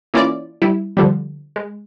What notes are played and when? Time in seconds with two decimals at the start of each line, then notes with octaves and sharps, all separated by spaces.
0.14 E3 A#3 C#4 E4 F4 D5
0.62 G3 E4
0.97 D3 F3 G3
1.56 G#3